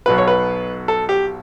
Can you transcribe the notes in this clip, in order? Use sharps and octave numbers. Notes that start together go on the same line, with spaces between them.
B1 B2 F#3 B4
C#5
B4
A4
G4